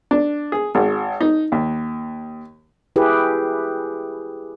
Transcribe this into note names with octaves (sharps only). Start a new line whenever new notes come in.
D4
G#4
G#1
D#4
D#2
E4 G4 G#4 B4